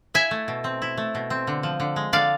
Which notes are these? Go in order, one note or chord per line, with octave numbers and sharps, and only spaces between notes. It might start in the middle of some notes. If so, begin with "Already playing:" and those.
E4 E5 G#5
A3
B2
C4
E4
A3
B2
C4
D3
F3
D3
G#3
D3 D5 F5